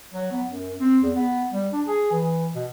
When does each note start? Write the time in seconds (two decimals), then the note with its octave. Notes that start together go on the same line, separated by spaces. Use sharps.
0.14 F#3
0.32 B3
0.51 F#2
0.80 C4
1.03 E2
1.15 B3
1.51 G3
1.73 D4
1.87 G#4
2.12 E3
2.55 B2